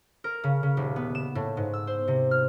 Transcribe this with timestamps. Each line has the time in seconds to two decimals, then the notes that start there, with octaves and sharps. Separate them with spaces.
0.24 A#4
0.44 C#3
0.63 C#3
0.77 D#1
0.96 B3
1.15 E7
1.35 A2
1.57 G#2
1.74 E6
1.87 C5
2.08 C3
2.31 F6